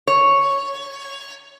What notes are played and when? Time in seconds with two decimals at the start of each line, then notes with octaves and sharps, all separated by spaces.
0.07 C#5